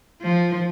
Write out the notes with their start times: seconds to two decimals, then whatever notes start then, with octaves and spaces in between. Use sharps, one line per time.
0.22 F3